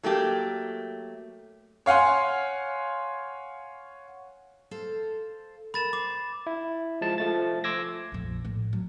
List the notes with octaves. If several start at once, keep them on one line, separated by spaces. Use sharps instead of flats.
F#3 A3 A#3 G4
C#5 F5 F#5 G#5 C6
A4 C5 F5
A#4 B5 A6 E7
C5 D6
E4
F3 G#3 A5
F3 A3 A6
C6 D6 E6 G#6 A#6
A#1 F2
A2
F#3